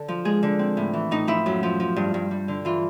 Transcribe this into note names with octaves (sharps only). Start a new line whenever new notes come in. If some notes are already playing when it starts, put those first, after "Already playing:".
Already playing: D3 A4
F3
G#3 G#4
D3
C4
A2
E3
A2 D#4
F3 E4
F#2
F3
F3
G2
G2
G3
D3
E3 F4